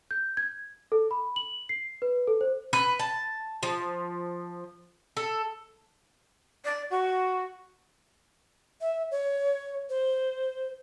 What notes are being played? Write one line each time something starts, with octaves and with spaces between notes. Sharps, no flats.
G6
G#6
A4
B5
F#7
C7
B4
A4
C5
B4
A5
F3
A4
D5
F#4
E5
C#5
C5